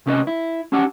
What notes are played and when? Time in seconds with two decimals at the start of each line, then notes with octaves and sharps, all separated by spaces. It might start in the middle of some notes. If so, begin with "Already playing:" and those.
0.06 C2 C3 C#4 G4 B4 D#5
0.27 E4
0.72 C#4 D4 G4 F#5